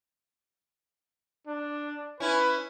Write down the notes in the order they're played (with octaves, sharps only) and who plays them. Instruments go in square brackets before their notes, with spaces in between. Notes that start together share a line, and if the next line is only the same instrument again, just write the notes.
[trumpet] D4
[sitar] C#4 E4 [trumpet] B4